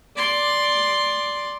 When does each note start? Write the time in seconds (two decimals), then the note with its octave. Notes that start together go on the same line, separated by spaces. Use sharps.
0.16 D5 C6